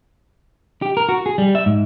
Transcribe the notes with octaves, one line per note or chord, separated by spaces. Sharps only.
G4
A#4
F#4
G#4
G3
E5
G#2